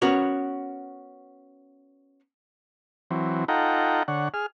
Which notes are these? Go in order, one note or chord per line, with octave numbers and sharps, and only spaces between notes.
B3 C#4 F#4 A#4 C#5
E3 F#3 C4
D#4 F4 A4 F#5 G5 A#5
D3 C#5 F#5
G#4 F6